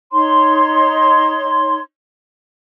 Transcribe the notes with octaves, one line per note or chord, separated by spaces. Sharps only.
D#4 C#5 C6